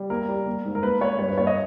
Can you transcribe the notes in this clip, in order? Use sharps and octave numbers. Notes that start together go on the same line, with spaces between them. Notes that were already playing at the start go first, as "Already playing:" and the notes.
Already playing: G3
A#3 A#4
G3
A#3
G#2
A#4
A#3 B4
A#3 C#5
G2 C#5
B4
A#3 C#5
D#5